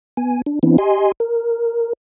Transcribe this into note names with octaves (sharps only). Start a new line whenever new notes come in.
B3 G#5
D4
E3 B3 C4 D4 E4
G4 D#5 G#5 C6
A#4